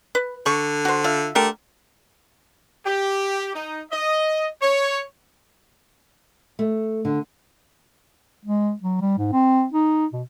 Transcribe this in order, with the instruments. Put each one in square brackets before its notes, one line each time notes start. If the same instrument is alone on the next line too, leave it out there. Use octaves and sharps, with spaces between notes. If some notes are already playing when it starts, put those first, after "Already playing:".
[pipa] B4
[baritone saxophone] D3 [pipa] C#6
[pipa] F#4 C5
F4 E5
[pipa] D3 G4 A#4 [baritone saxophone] A3
[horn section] G4
D#4
D#5
C#5
[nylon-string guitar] A3
D3
[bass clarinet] G#3
F#3
G3
G#2
C4
D#4
B2